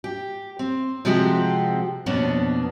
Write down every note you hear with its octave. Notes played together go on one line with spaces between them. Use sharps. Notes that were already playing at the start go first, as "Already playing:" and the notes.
G4
C4
C3 F3 G#3 C4 F#4 G4
F2 B2 A#3 B3 C#4 D4